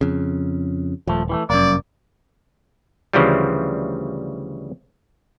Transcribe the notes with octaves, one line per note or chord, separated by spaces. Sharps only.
F2 C#3
D#1 F3 A3
E3 G3 A3
F1 F#2 A#3 D5
D2 C#3 E3 F3 G3